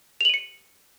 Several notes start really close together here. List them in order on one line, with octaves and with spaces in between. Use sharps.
F7 F#7 D#7 C#7